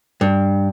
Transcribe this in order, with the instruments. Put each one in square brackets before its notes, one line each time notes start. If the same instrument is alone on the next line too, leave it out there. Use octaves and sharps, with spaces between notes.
[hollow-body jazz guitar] G2